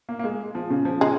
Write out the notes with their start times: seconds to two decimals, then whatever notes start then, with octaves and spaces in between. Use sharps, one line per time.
0.09 A#3
0.19 A#3
0.24 G#3
0.55 F3
0.70 C#3
0.85 F3
1.01 C#3 G#3